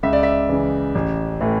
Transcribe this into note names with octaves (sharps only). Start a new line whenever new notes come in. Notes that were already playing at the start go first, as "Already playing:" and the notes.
C#2 E5
D5
E5
C#3 E3
A1
A2 E3